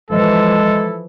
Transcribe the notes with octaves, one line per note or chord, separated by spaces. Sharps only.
E3 F3 G#3 E4 A4